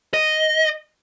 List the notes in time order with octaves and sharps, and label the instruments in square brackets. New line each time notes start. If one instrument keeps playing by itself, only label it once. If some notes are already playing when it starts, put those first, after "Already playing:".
[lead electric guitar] D#5